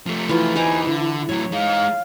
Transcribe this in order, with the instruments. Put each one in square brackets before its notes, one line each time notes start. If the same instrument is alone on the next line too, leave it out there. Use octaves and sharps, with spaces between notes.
[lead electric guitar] F3 A3
[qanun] E3 F4
[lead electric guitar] E2 D#4 [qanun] B4 C5 D6 [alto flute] G#5
[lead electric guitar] D3 [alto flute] E4
[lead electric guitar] A2 F#3 [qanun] C#5
[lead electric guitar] G#3 D#4 [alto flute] F5